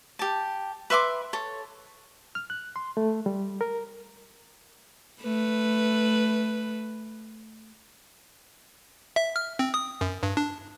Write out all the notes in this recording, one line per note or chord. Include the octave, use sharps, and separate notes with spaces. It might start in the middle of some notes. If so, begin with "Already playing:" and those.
G4 A5
B4 E5 C6 D6
A4 C#5
F6
F#6
C6
A3
G3
A#4
A3 B4
E5
F6
C4
D#6
F#2
G2
D4